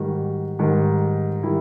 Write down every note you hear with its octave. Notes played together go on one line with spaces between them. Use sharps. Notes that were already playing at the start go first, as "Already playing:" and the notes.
Already playing: G#2 D#3 G3 F#4
G#2 D#3 G3
D#3 G3 E4